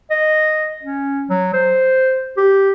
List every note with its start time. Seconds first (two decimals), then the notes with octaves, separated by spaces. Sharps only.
0.11 D#5
0.83 C#4
1.30 F#3
1.54 C5
2.37 G4